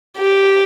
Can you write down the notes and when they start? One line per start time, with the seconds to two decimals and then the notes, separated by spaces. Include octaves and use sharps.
0.18 G4